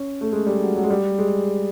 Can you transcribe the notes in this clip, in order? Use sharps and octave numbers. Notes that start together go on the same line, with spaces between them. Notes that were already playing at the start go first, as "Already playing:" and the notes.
Already playing: C#4
A3
G#3
G3
F#3
F#3
G#3
G3
G#3